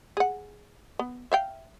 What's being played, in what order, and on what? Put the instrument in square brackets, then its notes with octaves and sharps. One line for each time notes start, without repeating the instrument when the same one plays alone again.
[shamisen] G#4 F#5
B3
E5 F5 G5